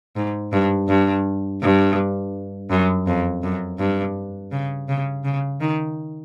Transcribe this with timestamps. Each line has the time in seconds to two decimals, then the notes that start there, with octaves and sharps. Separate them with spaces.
0.16 G#2
0.53 G2
0.89 G2
1.62 G2
2.71 F#2
3.07 F2
3.43 F#2
3.79 G2
4.52 C#3
4.89 C#3
5.24 C#3
5.61 D#3